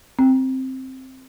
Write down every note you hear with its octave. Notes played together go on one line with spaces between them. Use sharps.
C4